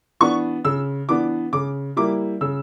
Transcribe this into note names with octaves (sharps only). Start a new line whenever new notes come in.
E3 B3 D4 C#6
C#3 E6
E3 B3 D4 D6
C#3 D6
G3 A#3 E4 D6
C#3 E6